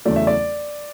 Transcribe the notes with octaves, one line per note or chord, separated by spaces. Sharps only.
E2 C#3 F#3 A3 D5
E5
D5